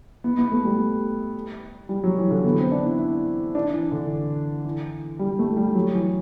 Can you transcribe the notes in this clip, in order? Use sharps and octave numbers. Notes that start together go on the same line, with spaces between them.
B3
B3
A3
G3
G3
F#3
E3
D3
B3
C4
D4
E4
E4
D4
E3
D3
E3
G3
A3
G3
F#3
E3